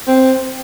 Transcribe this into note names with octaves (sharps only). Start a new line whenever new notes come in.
C4